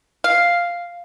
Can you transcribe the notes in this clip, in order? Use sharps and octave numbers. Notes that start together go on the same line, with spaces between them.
F5